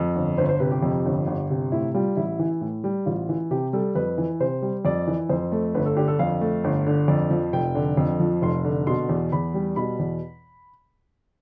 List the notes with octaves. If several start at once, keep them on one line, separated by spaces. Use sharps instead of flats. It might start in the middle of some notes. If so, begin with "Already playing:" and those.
Already playing: F2
G1
G1 C5
C5
C3 B4
G4
F2
G1
G1
C3
A2 E4
G3 F4
A1 E4
E3
A2
G3
A1 F4
E3
C3 G4
G3 A4
F2 B4
E3
C3 C5
G3
F2 D5
E3
F2 C5
A3
G1 B4
A4
D3 G4
A4
F2 F5
A3
G1
D3
F2 D5
F3
F1 G5
D3
F2
F3
F1 C6
D3
B2 C6
E2
E2 B5
G3
B2 B5
E2